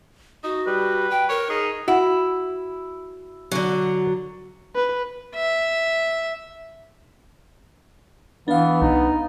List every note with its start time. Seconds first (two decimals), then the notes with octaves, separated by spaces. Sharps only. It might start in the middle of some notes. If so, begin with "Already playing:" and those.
0.44 D#4 F#4
0.67 G3 B4
1.10 G5
1.29 A#4 C#5
1.50 D#4 G#4
1.88 E4 F#4
3.52 D3 F#3
4.76 B4
5.35 E5
8.48 E3 B3 D4 F5
8.82 C2 D#4